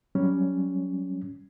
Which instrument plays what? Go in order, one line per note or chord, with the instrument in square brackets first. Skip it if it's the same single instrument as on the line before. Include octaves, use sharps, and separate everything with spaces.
[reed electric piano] F#3 G3 C#4